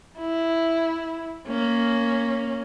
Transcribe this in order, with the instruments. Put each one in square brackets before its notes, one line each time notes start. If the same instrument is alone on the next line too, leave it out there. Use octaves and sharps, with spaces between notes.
[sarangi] E4
[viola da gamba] A#3 [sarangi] C#4